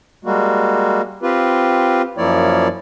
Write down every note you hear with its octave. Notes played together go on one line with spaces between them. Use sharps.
G3 G#3 A#3 F#4
C4 F4 G4 B4
F#2 F3 A#3 E4 C#5 D5